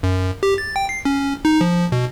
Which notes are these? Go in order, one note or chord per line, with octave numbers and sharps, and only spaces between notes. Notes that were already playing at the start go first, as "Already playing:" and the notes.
F#2
G4
A6
G5
C7
C#4
D#4
F3
B2